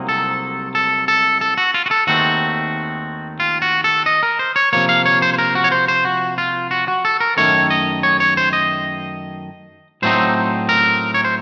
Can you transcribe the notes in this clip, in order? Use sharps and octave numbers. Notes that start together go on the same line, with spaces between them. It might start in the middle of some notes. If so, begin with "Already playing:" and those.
Already playing: C2 C3 F#3 A#3 D#4
A4
A4
A4
A4
F#4
F4
F#4
A4
D#2 D#3 A3 C4 F#4
F4
F#4
A4
D#5
A#4
C5
C#5
C3 F3 A#3 C#5
F5
C#5
C5
C5
A#4
F#4
C#5
C5
C5
F#4
F4
F#4
F#4
A4
A#4
F#2 D#3 A3 C#5
D#5
C#5
C#5
C5
D#5
A2 F#3 A3 C4 D#4 C5
A#4
C#5
C5